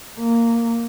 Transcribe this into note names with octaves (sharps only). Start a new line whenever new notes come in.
A#3